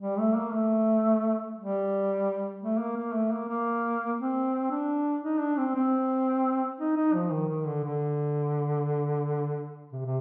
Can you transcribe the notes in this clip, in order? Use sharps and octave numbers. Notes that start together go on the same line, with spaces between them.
G3
A3
A#3
A3
G3
A3
A#3
A#3
A3
A#3
A#3
C4
D4
D#4
D4
C4
C4
D#4
D#4
F3
D#3
D#3
D3
D3
C3
C3